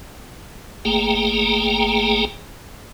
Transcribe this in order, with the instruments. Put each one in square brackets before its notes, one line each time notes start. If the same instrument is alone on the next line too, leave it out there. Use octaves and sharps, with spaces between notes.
[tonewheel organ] G1 A3 A#3 G#4 G5 A#5